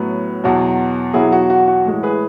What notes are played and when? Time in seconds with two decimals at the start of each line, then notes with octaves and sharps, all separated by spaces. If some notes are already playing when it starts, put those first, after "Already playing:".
Already playing: A2 F#3 B3
0.44 E2 B2 F#3
1.14 E2 B2 F#3 E4 G#4
1.32 F#4
1.50 F#4
1.68 F#4
1.85 A2 E3 G#3
2.03 G#4 B4